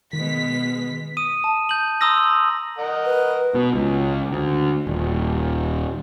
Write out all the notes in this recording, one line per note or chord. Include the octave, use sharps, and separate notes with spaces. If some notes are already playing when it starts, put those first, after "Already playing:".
B2 D#3 G#3 B6
D#6 D#7
A5
G6 F#7
A#5 C6 D#6 E6 A#6
A#4 D#5 F#5
B4
B2
C#2
D2
D#1